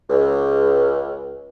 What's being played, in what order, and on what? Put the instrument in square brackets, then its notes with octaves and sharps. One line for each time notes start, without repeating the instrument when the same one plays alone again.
[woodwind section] C#2